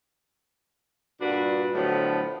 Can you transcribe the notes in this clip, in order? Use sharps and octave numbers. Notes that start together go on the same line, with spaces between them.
G2 A#2 D4 F#4 B4
A2 D3 F3 F#3 B3